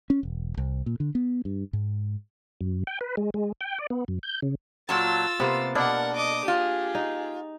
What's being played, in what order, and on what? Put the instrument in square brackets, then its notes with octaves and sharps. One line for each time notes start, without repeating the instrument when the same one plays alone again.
[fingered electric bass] C#4
E1
C2
A#2
D3
B3
G2
G#2
[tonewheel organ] F#2
G5
B4
G#3
G#3
G5
D5
B3
F#2
G6
C#3
[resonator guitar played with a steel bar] A#2 F#3 A5 [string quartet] F4 E6 A6
[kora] C3 A#3 [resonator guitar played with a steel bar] B3 C5
[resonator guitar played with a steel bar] B2 [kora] D4 D5 [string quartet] A#4 F#5
[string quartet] D#5 D6 D#6
[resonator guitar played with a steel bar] F4 [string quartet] G4 G#4
[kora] D#4